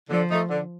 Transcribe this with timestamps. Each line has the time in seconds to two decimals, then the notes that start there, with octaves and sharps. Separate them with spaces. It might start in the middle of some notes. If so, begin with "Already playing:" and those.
0.10 D3 F3
0.30 A3 D#4
0.49 D3